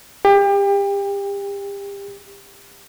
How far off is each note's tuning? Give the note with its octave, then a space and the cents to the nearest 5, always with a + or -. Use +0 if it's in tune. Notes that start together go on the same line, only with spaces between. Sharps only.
G4 +30